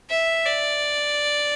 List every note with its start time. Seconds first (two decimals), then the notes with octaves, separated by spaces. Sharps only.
0.10 E5
0.46 D5